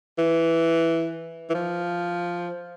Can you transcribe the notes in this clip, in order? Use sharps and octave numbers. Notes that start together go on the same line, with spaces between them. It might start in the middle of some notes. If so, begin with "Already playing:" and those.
E3
E3
F3